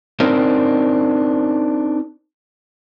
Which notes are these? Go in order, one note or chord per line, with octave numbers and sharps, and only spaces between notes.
C4 D4 D#4 A#4 C5